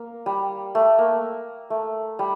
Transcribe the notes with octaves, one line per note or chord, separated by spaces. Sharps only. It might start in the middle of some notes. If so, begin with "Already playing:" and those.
Already playing: A#3
G3
A3
A#3
A3
G3